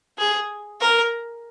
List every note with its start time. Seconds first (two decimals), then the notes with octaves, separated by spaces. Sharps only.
0.18 G#4
0.81 A#4